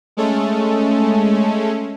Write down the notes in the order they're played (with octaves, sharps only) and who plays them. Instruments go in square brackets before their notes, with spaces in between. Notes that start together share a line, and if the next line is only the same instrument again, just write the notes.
[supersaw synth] G#3 A3 C#4 A4